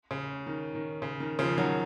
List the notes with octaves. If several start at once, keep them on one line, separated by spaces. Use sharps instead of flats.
C#3
D#3
D#3
C#3
D#3
C#3 F3
D#3 F#3